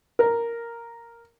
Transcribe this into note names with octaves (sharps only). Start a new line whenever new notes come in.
A#4